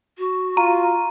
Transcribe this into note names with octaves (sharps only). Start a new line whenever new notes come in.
F#4
F4 A#5